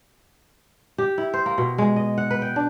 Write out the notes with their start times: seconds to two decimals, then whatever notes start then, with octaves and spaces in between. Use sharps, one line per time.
0.98 G4
1.18 E4
1.34 C5
1.46 A#3
1.58 B2
1.78 G#3
1.96 D#5
2.18 F#5
2.30 B4
2.42 G5
2.56 D4